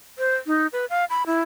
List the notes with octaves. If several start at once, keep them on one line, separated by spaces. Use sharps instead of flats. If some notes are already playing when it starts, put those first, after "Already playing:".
C5
D#4
B4
F5
B5
E4